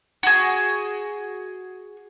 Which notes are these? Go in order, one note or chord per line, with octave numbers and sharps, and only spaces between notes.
F#4 G#4